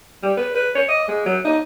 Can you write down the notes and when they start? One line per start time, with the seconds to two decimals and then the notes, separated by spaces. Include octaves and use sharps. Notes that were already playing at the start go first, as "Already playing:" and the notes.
0.23 G3
0.37 B4
0.55 B4
0.75 C#5
0.89 D#5
1.08 G#3
1.26 F#3
1.45 D#4